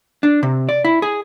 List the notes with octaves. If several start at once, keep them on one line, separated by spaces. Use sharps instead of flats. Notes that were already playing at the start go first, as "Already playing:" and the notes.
D4
C3
D5
E4
G#4